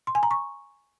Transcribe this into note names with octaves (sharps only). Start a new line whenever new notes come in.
C6
G#5
A#5
C#6